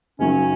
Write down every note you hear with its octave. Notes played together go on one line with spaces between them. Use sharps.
F#1 F#2 D#3 F#3 A#3 C#4